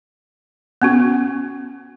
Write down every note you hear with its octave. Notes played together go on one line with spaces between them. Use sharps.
B3 C#4 F#4